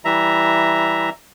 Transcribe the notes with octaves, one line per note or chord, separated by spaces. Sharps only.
E3 G3 E5 A#5